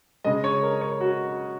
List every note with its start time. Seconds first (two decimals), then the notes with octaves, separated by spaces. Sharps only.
0.24 C#3 G#3 D#5
0.44 C#5
0.62 A#4
0.81 C#5
1.01 F#4